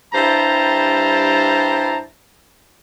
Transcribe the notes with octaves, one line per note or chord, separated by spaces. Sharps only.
G2 G3 E4 C5 A5 A#5